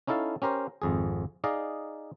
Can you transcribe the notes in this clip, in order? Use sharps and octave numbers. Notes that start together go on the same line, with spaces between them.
C#4 D#4 E4 A4 F5 A5
C#4 G4 A#4 C5
G#1 F2 G#4
D#4 G#4 D5 D#5 F5